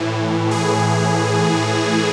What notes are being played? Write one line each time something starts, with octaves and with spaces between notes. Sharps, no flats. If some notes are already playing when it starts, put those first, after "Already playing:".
Already playing: A2 E3
G#4